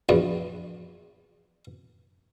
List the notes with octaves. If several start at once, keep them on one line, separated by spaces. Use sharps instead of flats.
A#1 E2